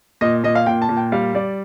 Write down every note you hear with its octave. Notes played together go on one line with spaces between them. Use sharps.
A#2 D#5
A#2 D#5
F5
A#2 G5
A5
A#2
G5
G3 F5
G3 D5